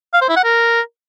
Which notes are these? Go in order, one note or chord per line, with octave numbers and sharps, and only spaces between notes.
F5
C5
E4
F#5
A#4